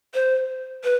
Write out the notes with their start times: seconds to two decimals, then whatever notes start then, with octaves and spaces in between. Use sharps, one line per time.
0.14 C5
0.84 B4